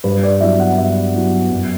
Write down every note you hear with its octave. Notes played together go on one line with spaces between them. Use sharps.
G2 B4
D5
F#3 B3 E4 E5
F#5
G2 E5
F#3 B3 E4
F#2